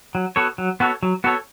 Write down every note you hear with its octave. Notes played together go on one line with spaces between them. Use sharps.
F#3
B3 F#4 A4 C#5
F#3
B3 F#4 A4 C#5
F#3
B3 F#4 A4 C#5